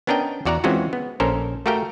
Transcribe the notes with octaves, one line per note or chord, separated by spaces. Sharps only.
B3 C#4 D4 A#4 D#5 G5
E2 F#4 D5 F#5 A#5
E3 G#3 C4 C#4 F4 F#4
B3
A#1 C#4 A4 A#4 C5
A3 F#4 G4 A#4 F5 G5